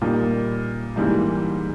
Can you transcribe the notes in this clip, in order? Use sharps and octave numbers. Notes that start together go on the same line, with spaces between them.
A#2 G3 A#3 D#4
G#2 E3 G3 A#3